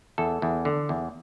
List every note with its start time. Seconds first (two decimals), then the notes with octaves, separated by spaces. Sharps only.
0.18 E2 A4
0.42 E2
0.65 D3
0.89 E2